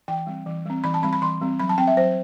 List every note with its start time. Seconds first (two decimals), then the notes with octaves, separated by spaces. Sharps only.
0.08 E3 G5
0.27 G3 C4
0.46 E3
0.66 G3 C4
0.84 E3 B5
0.94 A5
1.02 G3 C4 B5
1.13 B5
1.22 E3 C6
1.41 G3 C4
1.59 F#3 B5
1.69 A5
1.78 C4 G5
1.87 E5
1.97 F#3 C5